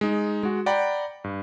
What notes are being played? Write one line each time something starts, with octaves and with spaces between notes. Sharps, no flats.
G#3 D#4
G#3 F#4
D5 F#5 G5 A#5 B5
G2